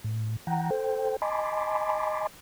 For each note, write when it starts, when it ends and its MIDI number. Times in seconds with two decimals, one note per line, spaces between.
0.04 0.36 45
0.47 0.70 52
0.47 0.70 78
0.47 0.70 79
0.47 0.70 82
0.71 1.16 69
0.71 1.16 72
0.71 1.16 79
1.22 2.27 75
1.22 2.27 80
1.22 2.27 81
1.22 2.27 83
1.22 2.27 84
1.22 2.27 86